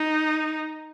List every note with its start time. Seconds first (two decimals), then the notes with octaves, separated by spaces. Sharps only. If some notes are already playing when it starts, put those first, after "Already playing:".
Already playing: D#4